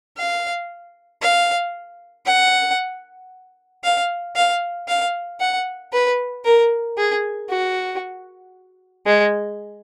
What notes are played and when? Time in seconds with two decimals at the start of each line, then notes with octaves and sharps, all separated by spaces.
0.17 F5
1.22 F5
2.26 F#5
3.84 F5
4.36 F5
4.88 F5
5.40 F#5
5.93 B4
6.45 A#4
6.98 G#4
7.50 F#4
9.06 G#3